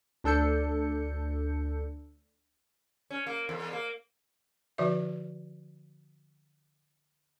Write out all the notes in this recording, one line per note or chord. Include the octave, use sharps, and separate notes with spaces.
D2 D4 A4 G6 C#7
C#4
A#3
E2
A#3
D3 F3 F#4 B4 D5 E5